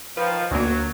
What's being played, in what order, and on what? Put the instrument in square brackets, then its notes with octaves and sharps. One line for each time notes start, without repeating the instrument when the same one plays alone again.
[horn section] D#3 F3 [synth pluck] B4
[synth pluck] D2 A#3 [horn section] F#3